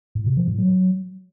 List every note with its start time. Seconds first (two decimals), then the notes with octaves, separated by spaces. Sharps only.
0.15 A2
0.26 C3
0.37 F3
0.48 A2
0.58 F#3